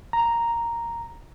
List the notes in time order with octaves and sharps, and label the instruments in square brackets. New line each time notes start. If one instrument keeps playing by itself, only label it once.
[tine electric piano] A#5